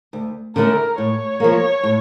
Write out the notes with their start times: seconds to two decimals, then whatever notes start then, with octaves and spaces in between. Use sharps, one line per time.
0.13 D2
0.56 D3 A3 C#4 E4 A#4
0.98 A2 C#5
1.40 F3 A#3
1.83 A2